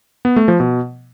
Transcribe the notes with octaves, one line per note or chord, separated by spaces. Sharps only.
B3
A3
F3
B2